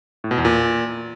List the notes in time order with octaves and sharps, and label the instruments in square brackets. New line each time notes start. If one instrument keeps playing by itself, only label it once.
[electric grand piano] A2
B2
E2
A#2